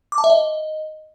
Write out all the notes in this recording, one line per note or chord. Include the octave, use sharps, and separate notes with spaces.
D6
A5
E5
D#5